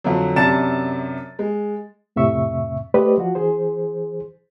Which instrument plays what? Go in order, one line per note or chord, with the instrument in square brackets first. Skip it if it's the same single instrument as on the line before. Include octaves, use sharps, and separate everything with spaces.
[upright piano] F2 D3 F#3
F#2 C3 D4 A5 A6 E7
G#3
[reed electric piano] F2 A2 C3 E5 C#6
A3 G4 B4 C5 D5 D#5
F3 F#4
E3 G#4 C5